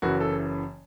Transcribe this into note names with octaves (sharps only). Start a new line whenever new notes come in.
F#1 F#2 C#3 E3 F#4
A4